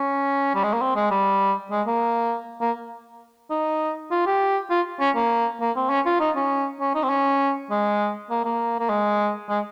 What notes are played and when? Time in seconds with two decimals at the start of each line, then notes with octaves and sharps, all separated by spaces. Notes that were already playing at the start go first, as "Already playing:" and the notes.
Already playing: C#4
0.55 G3
0.64 G#3
0.73 A#3
0.82 C4
0.96 G#3
1.11 G3
1.71 G#3
1.87 A#3
2.61 A#3
3.51 D#4
4.11 F4
4.27 G4
4.71 F4
5.00 C#4
5.16 A#3
5.61 A#3
5.76 C4
5.90 C#4
6.06 F4
6.20 D#4
6.36 C#4
6.81 C#4
6.95 D#4
7.04 C4
7.10 C#4
7.71 G#3
8.31 A#3
8.45 A#3
8.80 A#3
8.90 G#3
9.49 G#3